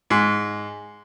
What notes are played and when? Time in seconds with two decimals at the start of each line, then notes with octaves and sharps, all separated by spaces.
0.10 G#2